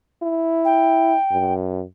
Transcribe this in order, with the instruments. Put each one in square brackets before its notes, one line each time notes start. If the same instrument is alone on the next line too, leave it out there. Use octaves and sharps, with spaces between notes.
[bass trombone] E4
[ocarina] G5
[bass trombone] F#2